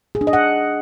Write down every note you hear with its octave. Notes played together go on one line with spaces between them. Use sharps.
G#4
D4
D#5
F#5